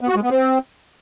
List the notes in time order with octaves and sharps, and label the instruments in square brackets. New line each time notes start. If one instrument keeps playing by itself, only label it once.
[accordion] B3
F#4
G#3
B3
C4